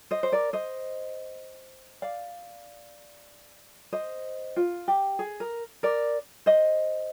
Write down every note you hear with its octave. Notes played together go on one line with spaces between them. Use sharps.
C5 D#5
C5
A#4 D5
C5 D#5
D5 F5
C5 D#5
F4
G4
G#4
A#4
A#4 D5
C5 D#5